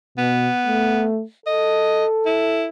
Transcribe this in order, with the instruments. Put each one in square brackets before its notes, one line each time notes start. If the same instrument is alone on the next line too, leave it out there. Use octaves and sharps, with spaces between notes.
[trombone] B2 [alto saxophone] B3
[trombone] A3
[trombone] A4 [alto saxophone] D#5
[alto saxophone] E4